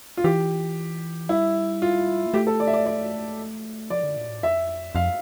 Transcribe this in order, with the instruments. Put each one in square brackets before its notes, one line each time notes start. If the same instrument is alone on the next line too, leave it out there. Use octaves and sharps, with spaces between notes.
[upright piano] F4
[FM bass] E3 [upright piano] G4
[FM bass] G3 [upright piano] E4
[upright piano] F4
[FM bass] A#3
[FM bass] A3 [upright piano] G4
[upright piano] A4
D5
E5
D5
D5
[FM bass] F3 [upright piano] D5
[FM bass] D3
A#2
A2
[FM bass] F2 [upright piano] E5
[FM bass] F2 [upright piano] F5